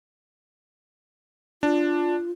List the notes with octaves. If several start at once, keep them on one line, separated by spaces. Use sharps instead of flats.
D4 F4